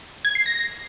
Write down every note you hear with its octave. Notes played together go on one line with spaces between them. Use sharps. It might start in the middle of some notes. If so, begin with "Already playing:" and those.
G#6
C7
A#6